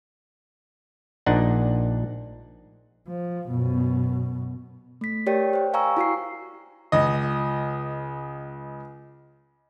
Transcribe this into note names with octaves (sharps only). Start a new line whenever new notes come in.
A#1 A#2 D4 D#4 F#5
F3
F#2 B2
A3 B6
G4 A#4 C#5 D5 G5
C5 G5
F5 G#5 A#5 C#6 E6
E4 F#4 F5 C7
C#2 D#5